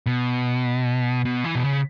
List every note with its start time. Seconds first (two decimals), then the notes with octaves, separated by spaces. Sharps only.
0.06 B2
1.25 B2
1.44 E3
1.55 B2
1.64 C#3